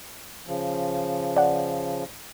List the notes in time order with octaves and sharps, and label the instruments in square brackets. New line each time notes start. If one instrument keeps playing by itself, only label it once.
[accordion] C#3 F3
[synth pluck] D5 F#5